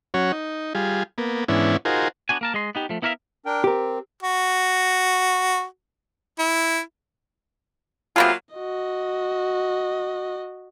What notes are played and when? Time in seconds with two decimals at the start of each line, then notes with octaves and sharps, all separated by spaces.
0.14 F#3 C#4 F#4 C#5
0.32 D#4
0.75 G3 F4 G#4
1.18 A#3 B3
1.48 G#2 E3 B3 C#4 D4 E4
1.85 D#4 F4 F#4 G#4 A#4 C5
2.29 B3 D4 F#4 G#5
2.41 A#3 A#4 A5
2.54 G#3 D#5 C6
2.75 B3 D#4 G4
2.89 F3 A3
3.02 B3 E4 A#4 C#5 E5 F5
3.46 D4 A#4 G5
3.64 C4 G4 A#4
4.23 F#4
6.39 E4
8.16 C3 F#3 A#3 B3 F4 G#4
8.55 F#4 D#5